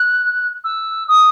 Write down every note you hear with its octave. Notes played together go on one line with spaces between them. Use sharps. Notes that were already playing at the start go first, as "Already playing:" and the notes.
Already playing: F#6
E6
D#6